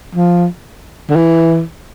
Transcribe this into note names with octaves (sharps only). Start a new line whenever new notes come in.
F3
D3
E3